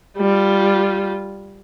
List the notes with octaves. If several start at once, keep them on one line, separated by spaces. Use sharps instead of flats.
G3 F4